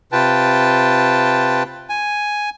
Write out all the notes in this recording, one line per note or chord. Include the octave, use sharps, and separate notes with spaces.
C3 F4 B4 G5 A5
G#5